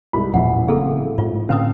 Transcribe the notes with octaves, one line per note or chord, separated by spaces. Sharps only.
C2 G#2 B5
E1 A1 A#2 F#3 E4 F#5
C#3 A#3 C4 G#4 A4
G#2 F4
A2 D3 C4 C#4 B4 F5 D#6